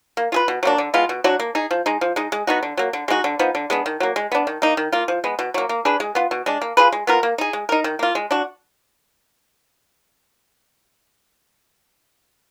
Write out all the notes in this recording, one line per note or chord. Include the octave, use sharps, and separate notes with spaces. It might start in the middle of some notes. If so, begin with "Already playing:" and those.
A#3
F4 G#4 B4
B2
F#3 A#3 D4
D3
G#3 B3 F4
B2
F#3 D4 F#4
A#3
D#4 G#4
F3
G#3 D#4
F3
G#3 D#4
G#3
B3 D#4 F#4
D3
F#3 A#3
D3
G#3 D#4 F#4
D3
F3 B3 D#4
D3
G#3 B3 D4
D#3
F#3 A#3
G#3
B3 D4
D#3
A#3 D#4
D#3
A#3 F4
F3
G#3 B3
B2
F#3 A#3
A#3
D4 G#4 B4
G#3
B3 F4
B2
G#3 D4
A#3
F4 G#4 B4
G#3
B3 F4 A#4
A#3
D#4 G#4
G#3
D#4 A#4
D#3
A#3 F4
G#3
D4 F#4